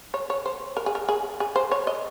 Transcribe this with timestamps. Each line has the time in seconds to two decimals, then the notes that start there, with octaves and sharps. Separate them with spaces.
0.14 C#5
0.30 C#5
0.46 C5
0.77 A#4
0.86 G#4
0.95 A#4
1.08 G#4
1.40 G#4
1.56 C5
1.72 C#5
1.87 D#5